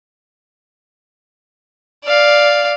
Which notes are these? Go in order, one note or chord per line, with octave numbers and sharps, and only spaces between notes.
D5 F5